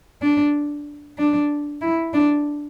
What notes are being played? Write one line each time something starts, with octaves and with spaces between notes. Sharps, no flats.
D4
D4
E4
D4